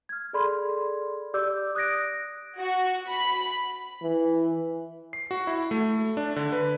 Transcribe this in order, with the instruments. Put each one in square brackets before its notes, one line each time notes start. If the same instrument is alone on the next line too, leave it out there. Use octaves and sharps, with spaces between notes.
[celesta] F6 G#6
G#4 A4 D5 B5 C6
G4 D5 D6 E6 G6
D#6 F#6 G#6 A#6 D7
[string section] F#4
B5
[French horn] E3
[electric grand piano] C7
F#4
E4
A3
D4
D3
B4